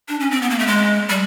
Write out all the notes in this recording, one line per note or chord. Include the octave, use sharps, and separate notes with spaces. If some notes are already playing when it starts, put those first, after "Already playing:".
D4
C#4
C4
B3
A#3
A3
G#3
G3